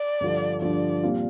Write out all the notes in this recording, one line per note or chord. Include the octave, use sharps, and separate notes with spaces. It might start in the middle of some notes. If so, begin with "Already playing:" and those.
Already playing: D5
G2 D3 F3
G2 D3 F3 D5
A#2 G3 C4 F4